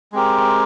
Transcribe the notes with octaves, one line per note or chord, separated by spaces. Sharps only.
G#3 C4 G4 A#4